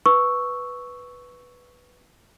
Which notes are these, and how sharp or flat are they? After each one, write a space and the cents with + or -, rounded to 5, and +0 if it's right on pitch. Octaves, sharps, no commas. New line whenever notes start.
B4 +0 C#6 +0 E6 +0